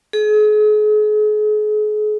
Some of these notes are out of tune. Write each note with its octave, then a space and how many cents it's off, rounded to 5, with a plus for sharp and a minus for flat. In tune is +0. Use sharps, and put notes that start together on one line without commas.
G#4 +40